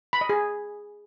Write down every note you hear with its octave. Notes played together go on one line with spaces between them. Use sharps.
B5
D#5
G#4